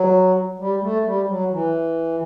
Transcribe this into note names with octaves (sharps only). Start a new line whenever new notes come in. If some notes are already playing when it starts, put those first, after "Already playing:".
Already playing: F#3
G3
A3
G3
F#3
E3